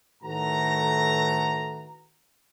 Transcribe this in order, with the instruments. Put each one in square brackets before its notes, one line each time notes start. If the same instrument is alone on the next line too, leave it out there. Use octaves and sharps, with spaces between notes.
[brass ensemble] A2 D#3 A3 F#4 B4 A#5